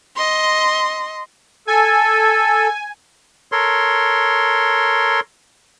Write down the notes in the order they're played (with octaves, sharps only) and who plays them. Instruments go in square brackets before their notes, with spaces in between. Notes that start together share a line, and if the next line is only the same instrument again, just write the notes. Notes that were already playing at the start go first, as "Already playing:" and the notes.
[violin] D#5 C6
[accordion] A4 [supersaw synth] G#5
[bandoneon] A4 A#4 C#5 C6